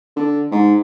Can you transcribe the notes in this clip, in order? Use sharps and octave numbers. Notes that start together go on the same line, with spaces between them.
D3
G#2